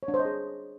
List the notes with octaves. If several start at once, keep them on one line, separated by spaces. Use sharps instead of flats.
C#5
D4
C5
D#5
G#4